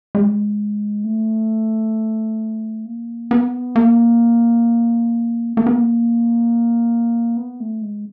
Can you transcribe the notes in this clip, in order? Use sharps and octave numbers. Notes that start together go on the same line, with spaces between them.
G#3
A3
A#3
B3
A#3
A#3
B3
A#3
B3
A3
G#3